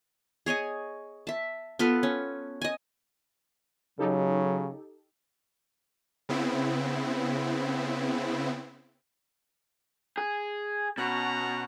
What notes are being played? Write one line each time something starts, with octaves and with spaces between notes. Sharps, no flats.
G#4 C#5 D#5 G#5
E5 A5
B3 F4 A4 B4
C#4
D#5 G#5
C#3 F#3 D#4 G4 A4
C#3 B3 C4 E4
G#4
B2 C#4 F#4 A#5